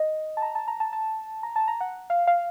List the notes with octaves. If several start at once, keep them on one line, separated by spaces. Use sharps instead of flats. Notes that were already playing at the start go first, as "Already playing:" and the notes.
Already playing: D#5
A5
A#5
A5
A#5
A5
A5
A#5
A5
A#5
F#5
F5
F5